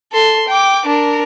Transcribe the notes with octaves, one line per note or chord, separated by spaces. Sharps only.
A4 C6
G5 D6
D4 A#4